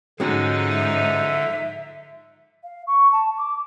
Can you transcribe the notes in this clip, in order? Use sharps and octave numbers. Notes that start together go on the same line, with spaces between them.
G#2 D3 F3 G#3 C#4 D#4 F#4
E5
F5
C#6
A5
D6